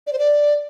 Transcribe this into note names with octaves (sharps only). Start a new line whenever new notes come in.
D5
C5
D5